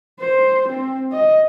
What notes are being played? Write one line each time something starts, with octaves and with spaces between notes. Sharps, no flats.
C5
C4
D#5